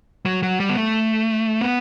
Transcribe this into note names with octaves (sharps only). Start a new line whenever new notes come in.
F#3
F#3
G3
B3
A3
B3